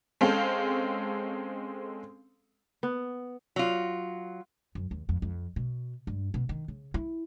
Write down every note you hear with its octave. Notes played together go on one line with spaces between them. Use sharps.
G#3 C4 C#4 A4 F5
B3
F#3 F4
F#2
D#2
F2
F2
B2
G2
B2
D#3
C#3
E4